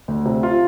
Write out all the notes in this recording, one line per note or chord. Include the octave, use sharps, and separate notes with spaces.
D2
C3
F4